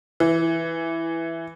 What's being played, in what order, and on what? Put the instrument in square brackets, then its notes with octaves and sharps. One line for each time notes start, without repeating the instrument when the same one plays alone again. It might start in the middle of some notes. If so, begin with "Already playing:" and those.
[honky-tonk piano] E3